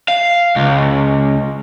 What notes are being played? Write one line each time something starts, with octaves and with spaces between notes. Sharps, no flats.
F5
C#2